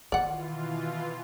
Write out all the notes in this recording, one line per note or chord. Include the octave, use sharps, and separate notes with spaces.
B2 D#3 E3 F4 D5 F#5